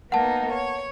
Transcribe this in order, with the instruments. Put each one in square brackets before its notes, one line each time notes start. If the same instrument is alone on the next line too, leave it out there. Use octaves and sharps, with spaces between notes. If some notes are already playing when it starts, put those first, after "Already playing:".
[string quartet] A#3 B3 D#4 [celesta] F#5 A5
[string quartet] C#5